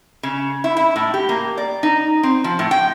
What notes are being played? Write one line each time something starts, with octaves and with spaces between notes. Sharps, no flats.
C#3
E4
E4
A2
G4
A#3
D5
D#4
C4
F3
A2
G5